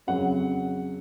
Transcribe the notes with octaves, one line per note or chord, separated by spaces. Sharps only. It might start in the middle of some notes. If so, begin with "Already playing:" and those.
F2 C#3 F#3 F#5